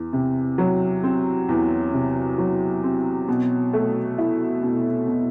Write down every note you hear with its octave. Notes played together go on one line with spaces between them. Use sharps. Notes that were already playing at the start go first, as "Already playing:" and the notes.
Already playing: E2
C3
F#3
C4
E2
C3
F#3
C4
B2
A3
E4
B2
B2